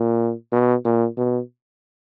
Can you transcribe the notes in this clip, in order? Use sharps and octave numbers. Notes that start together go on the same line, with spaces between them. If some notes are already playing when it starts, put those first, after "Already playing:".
Already playing: A#2
B2
A#2
B2